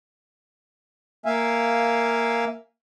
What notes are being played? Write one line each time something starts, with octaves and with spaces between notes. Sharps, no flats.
A#3 E5 F5 G#5